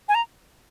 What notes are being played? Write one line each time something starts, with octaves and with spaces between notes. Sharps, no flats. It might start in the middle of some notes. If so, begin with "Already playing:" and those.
G#5
A#5